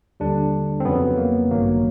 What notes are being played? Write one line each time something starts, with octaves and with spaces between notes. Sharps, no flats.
D#2 D3 G3 D4
C4
F2 C#3 F#3 B3
A#3
A1 G2 D#3 F#3 A#3